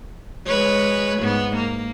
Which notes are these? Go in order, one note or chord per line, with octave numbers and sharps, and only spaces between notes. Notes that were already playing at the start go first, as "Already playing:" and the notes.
G#3 B4 C#5
G#2 B3
A#3